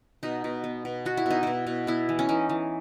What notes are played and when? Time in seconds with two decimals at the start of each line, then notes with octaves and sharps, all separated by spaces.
0.23 B2 D#4
0.44 B2
0.64 B3
0.85 B2
1.05 B3 F#4
1.17 E4
1.26 B2 D#4
1.43 B2 E4
1.67 B2
1.87 B3 E4
2.09 E3
2.19 C#4
2.29 E3 D#4
2.49 E3